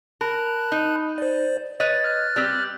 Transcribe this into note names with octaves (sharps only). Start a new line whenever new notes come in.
A#4 A5 B5 F#6
D#4
C5 D5
B4 C#5 D#5 A6
F6 F#6 A6
G3 C4 G4